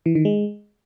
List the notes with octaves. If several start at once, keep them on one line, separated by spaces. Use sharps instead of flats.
E3
D#3
G#3